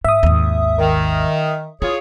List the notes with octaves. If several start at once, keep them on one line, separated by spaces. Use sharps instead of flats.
G#2 E5 D#6
G#1 D#2
D#3
E4 F4 G#4 C#5